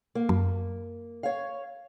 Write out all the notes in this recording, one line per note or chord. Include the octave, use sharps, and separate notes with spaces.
A#3
F#2
C#5 F5